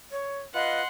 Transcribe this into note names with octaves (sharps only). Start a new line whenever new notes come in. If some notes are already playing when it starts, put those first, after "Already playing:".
C#5
F4 B4 D#5 F#5 C6